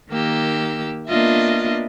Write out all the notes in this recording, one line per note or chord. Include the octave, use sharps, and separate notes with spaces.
D#3 A#3 G4 E6
A#3 B3 D4 F4 D#5 E5